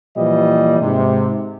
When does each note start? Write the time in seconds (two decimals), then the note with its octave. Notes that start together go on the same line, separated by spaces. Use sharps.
0.17 A#2 E3 F3 G3 D#5
0.80 G#2 C3